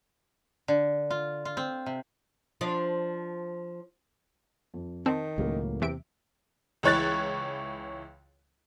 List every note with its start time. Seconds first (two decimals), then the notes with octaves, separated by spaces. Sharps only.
0.68 D3
1.10 F4
1.45 F4
1.57 C4
1.86 C3
2.61 F3 D4
4.74 F2
5.06 D#3 C4 A5
5.38 C#2 A2 F#3 A#3 C#4
5.82 E2 C3 E5 D7
6.83 C#2 E3 C#5 F#6 A6